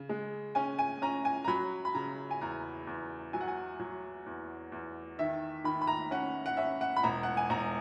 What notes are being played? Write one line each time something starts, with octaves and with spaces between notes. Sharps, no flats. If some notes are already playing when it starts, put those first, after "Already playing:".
Already playing: C#3
G#3
C#4 G#5
G#5
C#4 A#5
G#5
A#5
F#3 B5
B5
C#3 A#5
G#5
E2 A#5
E2
F#3 G#5
F#5
G#5
F#3
E2
E2
D#3 E5
D#3 B5
B5
A#5
C#4 F#5
F#5
C#4 E5
F#5
B5
E1 A#5
F#5
G#5
E1 A#5